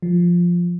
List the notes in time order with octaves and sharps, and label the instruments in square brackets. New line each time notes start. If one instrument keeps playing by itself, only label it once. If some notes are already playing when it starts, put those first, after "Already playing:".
[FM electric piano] F3